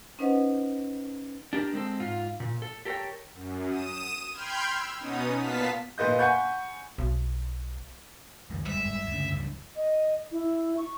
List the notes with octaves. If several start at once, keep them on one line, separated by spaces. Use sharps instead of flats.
C#4 D#4 B4 C5 D#5 F#5
D4 G4 A#4
G#3 C4 A4
G#2 F4
A#2
A4
G4 A4 A#4 C5 C#5 G5
F#2
D#6 D#7 E7
G5 B5 C6 F6 G6 G#6
E6
B2 B3 C#4 D#4 D#6
A#2 B3 F5 A5 B6
A#2 B4 D#5 G6
F#5 G#5 B5 C#6 G6
B1
C#2 F#2 D#3
G1 G3 G#3 E5
G2
D2 C#3
C#2 G2
D#5
E4
C#6